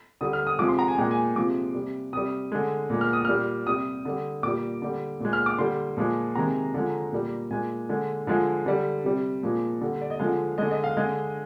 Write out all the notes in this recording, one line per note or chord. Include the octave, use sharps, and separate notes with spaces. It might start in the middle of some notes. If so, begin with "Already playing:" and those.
D3 G3 D#6
F6
D#6
C3 F3 G#3 D6
C6
A#5
G#5
A#2 G#3 G5
G#5
C3 F3 G#3 D6
C3 G3
C3 G3 D#6
D3 G#3
A#2 G#3
F6
D#6
A#2 G3 F6
C3 G3 D#6
D3 G3
A#2 G3 D6
D3 G3
A#2 G#3
F6
D6
D3 G3 C6
A#2 F3 G#3
C3 D#3 G#3 A#5
D3 F3 G#3
A#2 G3
A#2 G#3 G#5
D3 G#3
D3 F3 G#3
D3 G3
C3 G3
A#2 F3 G#3
D3 G3
D5
D#5
D3 F3 G#3 F5
D3 G#3 D#5
D#5
F5
D3 G#3 D#5